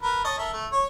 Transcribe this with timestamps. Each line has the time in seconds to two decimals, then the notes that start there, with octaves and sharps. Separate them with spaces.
0.02 A#4 B4
0.25 C#5 D#5 A5
0.38 A4 A#4 E5
0.53 A3
0.72 C#5